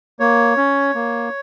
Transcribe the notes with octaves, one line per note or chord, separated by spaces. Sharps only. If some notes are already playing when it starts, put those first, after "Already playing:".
A#3 C#5
C#4
A#3